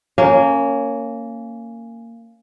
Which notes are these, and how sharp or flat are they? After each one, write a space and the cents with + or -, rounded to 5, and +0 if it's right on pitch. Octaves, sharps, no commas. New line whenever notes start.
A#3 -20 C#4 +0